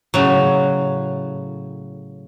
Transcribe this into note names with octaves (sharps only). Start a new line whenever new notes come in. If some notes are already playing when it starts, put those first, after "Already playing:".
A2 C#3 F#3